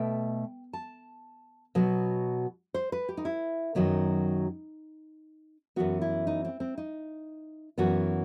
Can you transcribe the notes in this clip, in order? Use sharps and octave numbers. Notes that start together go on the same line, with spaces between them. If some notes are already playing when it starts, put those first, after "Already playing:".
Already playing: B2 A3 G5
A5
B2 F#3 B3
C5
B4
G4
D#4
E4
F#2 D#3 F#3 B3 D#4
F#2 E3 B3 F#4
E4
D#4
C4
C4
D#4
F#2 E3 B3 F#4